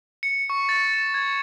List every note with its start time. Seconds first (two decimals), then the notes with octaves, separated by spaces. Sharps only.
0.23 C#7
0.50 C#6
0.69 A6
0.94 E7
1.14 G#6